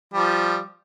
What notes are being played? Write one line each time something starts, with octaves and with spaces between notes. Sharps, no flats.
F3 G3